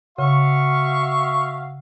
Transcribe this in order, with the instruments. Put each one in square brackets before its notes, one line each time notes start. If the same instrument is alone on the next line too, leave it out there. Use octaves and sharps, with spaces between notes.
[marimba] C#3 [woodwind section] F#4 E5 F5 [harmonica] C#6